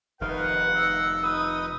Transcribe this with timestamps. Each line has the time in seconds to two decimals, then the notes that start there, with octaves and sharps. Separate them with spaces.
0.21 F1 D#3 D#4 A#4 B4 F5 F#5
0.75 D#5 F5 E6
1.23 D#4 B4 D#6